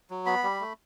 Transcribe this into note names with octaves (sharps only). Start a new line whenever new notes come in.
F#3
B3 B5
G3
A3